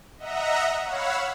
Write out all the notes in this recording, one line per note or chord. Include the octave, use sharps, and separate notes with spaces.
D#5 E5 F#5 A#5
C#5 F5 F#5 B5 E6